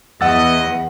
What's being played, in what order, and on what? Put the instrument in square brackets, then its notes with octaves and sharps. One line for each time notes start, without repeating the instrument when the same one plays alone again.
[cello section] E2 [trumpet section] E4 D#5 [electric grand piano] F#5 E6 A6